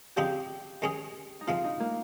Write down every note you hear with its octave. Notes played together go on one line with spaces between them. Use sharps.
C#3 F3 C4 D#4 G4
D#3 G#3 C#4 G#4
D#4
C3 F3 G#3 F4
D#4
A#3